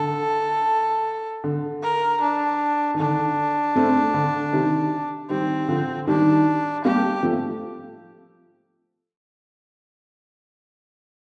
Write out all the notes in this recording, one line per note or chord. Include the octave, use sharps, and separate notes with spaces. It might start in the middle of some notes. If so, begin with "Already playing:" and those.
Already playing: D3 A4
D3
A#4
D4
D#3
D3 D4
A3 C4
D3
C3 D#3
D#3 G3 C4
D3 F3
D#3 G3 D4
G3 A#3 G4
F3 A3